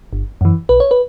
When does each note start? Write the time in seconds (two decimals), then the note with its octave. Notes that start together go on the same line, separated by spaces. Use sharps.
0.13 G1
0.41 F#2 E3
0.69 B1 B4
0.80 C#5
0.91 B4